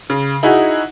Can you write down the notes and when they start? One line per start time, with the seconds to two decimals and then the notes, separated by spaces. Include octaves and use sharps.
0.10 C#3
0.43 D#4 E4 F#4 G#4